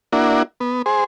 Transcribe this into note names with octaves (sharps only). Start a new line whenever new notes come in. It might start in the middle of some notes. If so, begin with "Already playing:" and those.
A#3 D4 E4 F#4
B3
G#4 C5